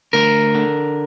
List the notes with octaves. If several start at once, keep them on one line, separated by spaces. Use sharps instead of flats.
D2 A#4
D3